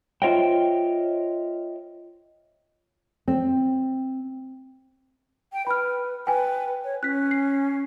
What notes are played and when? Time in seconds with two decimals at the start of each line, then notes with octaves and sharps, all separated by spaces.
0.22 F4 C5 C#5 D#5 E5 G5
3.28 C4
5.53 G5
5.67 B4 B5 F6
6.27 B4 G5 G#5
6.84 C#5
7.03 C#4 F#6 B6
7.31 C7